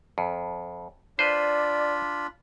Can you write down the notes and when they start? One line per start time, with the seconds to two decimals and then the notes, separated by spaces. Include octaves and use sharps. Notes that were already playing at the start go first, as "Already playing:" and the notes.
0.18 F2
1.19 D4 F4 B4 C5 D5 B5